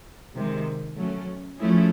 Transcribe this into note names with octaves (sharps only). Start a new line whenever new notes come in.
C3 D#3 G#3
F#3 A3 C#4
F3 A3 C#4 E4 G#4